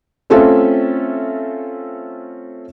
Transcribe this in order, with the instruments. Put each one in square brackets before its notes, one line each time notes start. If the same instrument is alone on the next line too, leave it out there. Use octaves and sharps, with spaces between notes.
[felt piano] A3 C4 C#4 F4 A4 E5